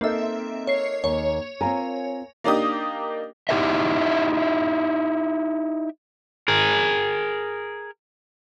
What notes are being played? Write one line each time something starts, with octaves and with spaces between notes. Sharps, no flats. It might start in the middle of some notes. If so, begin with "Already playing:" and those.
A#3 C4 D#4 A4 E5
C#5 C7
D#2 C#5
C4 F4 A#4 G#5 A#5
A#3 D4 D#4 G4 D#6
D#4 E4 G4 A#4 C5 E5
G#4 A#4